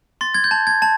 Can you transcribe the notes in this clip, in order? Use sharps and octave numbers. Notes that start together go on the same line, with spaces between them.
C6 A6
G#6
G6
A5
G#6
A5